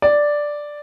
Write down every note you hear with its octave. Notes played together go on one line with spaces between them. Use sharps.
D5